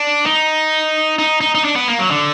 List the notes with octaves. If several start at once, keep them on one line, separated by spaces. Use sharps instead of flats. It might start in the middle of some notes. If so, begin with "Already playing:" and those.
Already playing: D4
D#4
D#4
D#4
D#4
D4
B3
A#3
F#3
D3